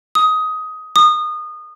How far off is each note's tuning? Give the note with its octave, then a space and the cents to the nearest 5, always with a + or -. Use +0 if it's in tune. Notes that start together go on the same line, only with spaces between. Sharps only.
D#6 +15
D#6 -25